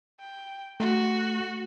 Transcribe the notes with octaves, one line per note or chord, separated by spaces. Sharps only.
G5
A3 F#4